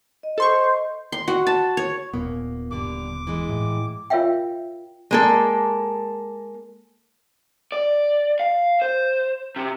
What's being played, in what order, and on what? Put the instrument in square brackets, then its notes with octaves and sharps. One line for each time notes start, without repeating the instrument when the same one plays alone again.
[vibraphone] D#5
[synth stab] A4 C6 C#6 [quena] C5
[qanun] C6
F#4
A5
C#5
[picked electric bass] D#1 A#2 B3 [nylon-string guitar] A#3
[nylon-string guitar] G2 D3 G3 [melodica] D6
[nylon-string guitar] E3 G#3
[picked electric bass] A2
[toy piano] F4 A#4 C#5 E5 F5 G5
[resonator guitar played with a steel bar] G#3 A#3 A4
[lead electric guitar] D5
F5
C5
C3